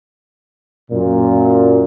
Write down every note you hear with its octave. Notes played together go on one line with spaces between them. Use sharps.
F#2 A#2